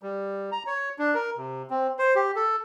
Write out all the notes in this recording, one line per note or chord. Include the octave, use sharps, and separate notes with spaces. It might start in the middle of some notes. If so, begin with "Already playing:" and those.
G3
A#5
C#5
D4
A#4
C3
C4
C5
G4
A4